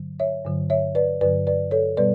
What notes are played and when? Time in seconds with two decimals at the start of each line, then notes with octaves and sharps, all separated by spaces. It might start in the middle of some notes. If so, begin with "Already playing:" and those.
Already playing: G2 D3 F#3
0.20 C#5 E5
0.45 G2 D3 F#3
0.70 C#5 E5
0.95 B4 D5
1.21 G2 D3 F#3 B4 D5
1.47 B4 D5
1.71 A4 C#5
1.97 B2 G3 B3 B4 D5